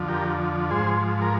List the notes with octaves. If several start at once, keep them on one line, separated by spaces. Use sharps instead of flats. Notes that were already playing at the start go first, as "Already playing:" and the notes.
Already playing: F2 D3 F3
G4 A#4
G#2 F3 G#4 C5
A#4